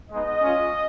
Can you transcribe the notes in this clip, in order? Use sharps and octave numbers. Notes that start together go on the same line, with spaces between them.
G#3 B3 D#4 D#5
G#3 C#4 F4